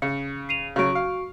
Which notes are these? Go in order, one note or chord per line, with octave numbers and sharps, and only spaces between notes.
C#3 C#7
C7 D#7 F7
C#3 F#3 F#4 C#6 D7
F5